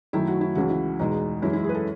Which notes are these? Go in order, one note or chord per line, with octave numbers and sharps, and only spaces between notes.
F#2 D#3 F#3 A3 E4
F#4
E4
C#2 C#3 E3 F#4
E4
E2 B2 G#3 D#4
F#2 E3 G#3 E4
E4
G#4
B4
A4